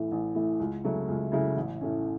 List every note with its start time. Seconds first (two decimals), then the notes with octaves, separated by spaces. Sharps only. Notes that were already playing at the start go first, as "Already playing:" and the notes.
Already playing: A1 A2 E3 A3
0.11 A1
0.35 A2 E3 A3
0.60 C#2
0.84 C#3 F#3 A3 E4
1.08 C#2
1.32 C#3 F#3 A3 E4
1.56 A1
1.81 A2 A3 C#4